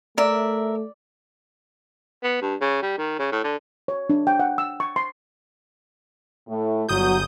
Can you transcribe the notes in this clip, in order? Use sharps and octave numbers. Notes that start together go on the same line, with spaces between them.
A3 A#4 D5 E5
B3
G2
C#3
G3
D#3
C#3
A2
D3
C#5
D4
G5
F#5
E6
C#6
C6
A2 A3
G1 F#3 D#6 G6